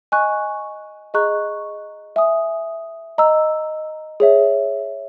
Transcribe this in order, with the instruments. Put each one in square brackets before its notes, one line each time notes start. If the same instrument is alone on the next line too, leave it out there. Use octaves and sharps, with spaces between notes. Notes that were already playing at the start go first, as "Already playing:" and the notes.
[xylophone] D#5 G#5 C#6 F#6
G#4 D#5 A#5 C#6 F#6
E5 G#5 D#6
D#5 A#5 E6
G#4 C#5 E5